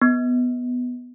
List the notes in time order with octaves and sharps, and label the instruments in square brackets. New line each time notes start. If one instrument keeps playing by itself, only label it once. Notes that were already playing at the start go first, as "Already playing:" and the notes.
[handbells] B3